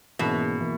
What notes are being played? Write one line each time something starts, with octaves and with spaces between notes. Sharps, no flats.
G#2 B2 E3 A#3 C#4 G#4
E3 A#3